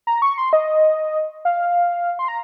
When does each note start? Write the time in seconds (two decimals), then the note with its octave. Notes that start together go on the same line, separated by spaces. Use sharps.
0.07 A#5
0.22 C#6
0.38 C6
0.53 D#5
1.45 F5
2.19 C6
2.28 A#5